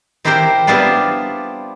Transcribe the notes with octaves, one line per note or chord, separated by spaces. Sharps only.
C4 E4 G4 A#4 C5 G5
G3 B3 C4 D4 E4 F4